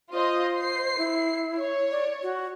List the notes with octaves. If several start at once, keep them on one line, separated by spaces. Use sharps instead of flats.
F4 C5 D#5
C7
E4
C#5
D5
F#4